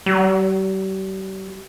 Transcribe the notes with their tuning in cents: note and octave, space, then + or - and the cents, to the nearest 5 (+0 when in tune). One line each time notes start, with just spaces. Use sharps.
G3 -40